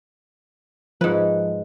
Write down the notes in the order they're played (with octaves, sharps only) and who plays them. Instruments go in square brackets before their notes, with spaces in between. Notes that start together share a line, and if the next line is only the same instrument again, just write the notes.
[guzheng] G#2 B4 [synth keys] F3